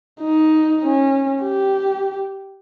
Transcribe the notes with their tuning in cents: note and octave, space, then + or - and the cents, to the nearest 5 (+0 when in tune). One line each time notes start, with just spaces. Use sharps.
D#4 +10
C#4 -25
G4 -10